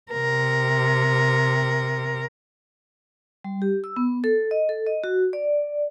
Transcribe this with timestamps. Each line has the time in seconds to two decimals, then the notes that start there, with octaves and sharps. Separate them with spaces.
0.12 C3 A#4
3.44 G3
3.62 G4
3.84 E6
3.96 B3
4.24 A4
4.51 D#5
4.69 A4
4.87 D#5
5.04 F#4
5.33 D5